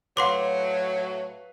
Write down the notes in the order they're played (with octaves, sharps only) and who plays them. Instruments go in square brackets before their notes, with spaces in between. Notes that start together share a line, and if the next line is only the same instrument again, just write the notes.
[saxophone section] A2 F#3 [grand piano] B4 F5 [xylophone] F#5 C6 D6